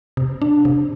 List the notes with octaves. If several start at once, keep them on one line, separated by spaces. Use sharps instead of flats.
C3
D4
C3